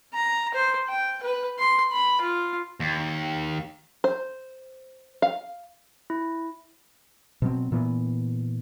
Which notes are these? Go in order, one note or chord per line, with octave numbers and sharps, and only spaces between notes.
A#5
C5
G5
B4
C6
B5
F4
D#2
C5
F5
E4
B2 F#3 C4
A#2 E3 B3